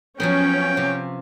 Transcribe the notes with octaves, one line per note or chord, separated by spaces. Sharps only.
F3 F#3 B3 C#4 G5
C3